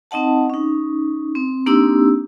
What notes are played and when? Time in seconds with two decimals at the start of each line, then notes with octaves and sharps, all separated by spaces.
0.11 C4 D#4 D#5 F#5 A5
0.50 C#4 D#4
1.35 C4
1.66 A#3 C4 D4 D#4 G4 E6